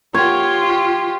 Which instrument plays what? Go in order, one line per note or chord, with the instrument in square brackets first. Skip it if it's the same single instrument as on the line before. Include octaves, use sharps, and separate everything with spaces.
[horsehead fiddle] F4 G4 [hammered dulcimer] C#5